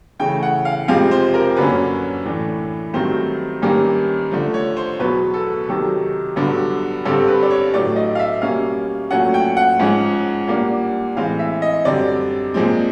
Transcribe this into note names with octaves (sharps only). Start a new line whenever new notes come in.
C#3 E3 A3 G5
F#5
F5
F2 C3 F3 G#3 C4 F5
C5
A#4
F#2 D3 F#3 A#3 C#4 B4
A2 E3 A3 D4
G2 D#3 F#3 A3 C4 C5
G2 D#3 G3 A#3 C#4
D3 F3 A3
C#5
C5
E2 B2 F#3 B3 B4
A4
C3 D#3 F#3 A4
G2 D3 F#3 B3 D4
G2 D3 G3 C4 A4
B4
D5
C#5
A2 F#3 A3 D4 D5
D#5
F5
E5
B2 G3 A#3 C#4 F5
A#2 F#3 A3 C#4 F#5
G5
F#5
G#2 F3 G#3 C#4
A#2 G3 A#3 D4
A2 E3 G#3 C4 F5
E5
D#5
F#2 D3 G3 C4 D5
A#2 F3 G#3 C4